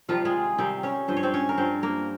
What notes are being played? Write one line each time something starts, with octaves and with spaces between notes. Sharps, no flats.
C3 D#3 F3 G3 F4
G#3 G#4
C3 D#3 G3 C4 C5
C#4 C#5
G2 F3 C5
C#5
C4 C5
C#4 C#5
A#4
G2 F3 C4 C5
A#3 A#4